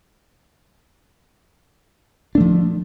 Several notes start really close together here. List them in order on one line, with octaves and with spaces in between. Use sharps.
D4 A3 F3